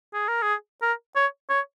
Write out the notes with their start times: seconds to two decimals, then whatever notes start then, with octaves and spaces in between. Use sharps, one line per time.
0.14 G#4
0.28 A#4
0.42 G#4
0.82 A#4
1.16 C#5
1.50 C#5